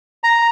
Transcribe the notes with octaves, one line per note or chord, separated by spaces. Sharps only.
A#5